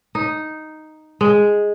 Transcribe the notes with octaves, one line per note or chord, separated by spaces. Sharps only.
D#4
G#3